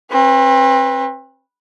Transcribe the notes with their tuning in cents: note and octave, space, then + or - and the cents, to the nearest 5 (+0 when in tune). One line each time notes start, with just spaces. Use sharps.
C4 +35 B4 +0